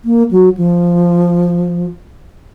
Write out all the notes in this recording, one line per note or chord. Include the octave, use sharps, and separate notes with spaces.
A#3
F#3
F3